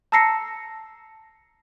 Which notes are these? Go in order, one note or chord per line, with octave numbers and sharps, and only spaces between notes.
A5 A#5 E6 A#6 C7 C#7